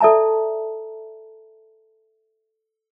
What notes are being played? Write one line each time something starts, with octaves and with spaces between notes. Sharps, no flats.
A4 D5 E5 A5 A#5